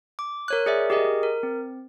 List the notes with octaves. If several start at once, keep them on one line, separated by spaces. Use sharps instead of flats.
D6
A#4 C#5 F#6
G#4 D5 E5
G4 G#4 A#4 D#5
A#4
C4